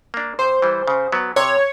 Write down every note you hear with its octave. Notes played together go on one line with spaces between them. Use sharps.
A#3 D4
C3 C5
E3 G3
C#3
F#3 B3
C3 C#5